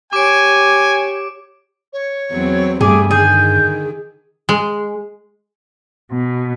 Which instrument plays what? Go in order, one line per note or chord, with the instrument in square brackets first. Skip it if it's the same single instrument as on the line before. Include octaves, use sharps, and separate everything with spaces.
[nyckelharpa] G4 C#5 [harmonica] G#5 [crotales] D6 D7
[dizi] C#5
[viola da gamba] E2 F#3 C4
[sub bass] G2 [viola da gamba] G3 A3 [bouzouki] G#4 [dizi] D6
[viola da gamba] D3 D#3 [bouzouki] G#4 [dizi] G6
[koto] G#3
[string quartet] B2